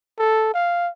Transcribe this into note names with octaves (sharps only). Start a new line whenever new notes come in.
A4
F5